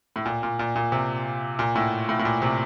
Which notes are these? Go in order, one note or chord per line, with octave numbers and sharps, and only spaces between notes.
A2
A#2
A#2
A#2
A#2
C3
A#2
A2
A2
A2
A#2
C3